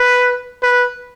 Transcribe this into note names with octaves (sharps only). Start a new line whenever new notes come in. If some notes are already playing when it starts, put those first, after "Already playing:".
Already playing: B4
B4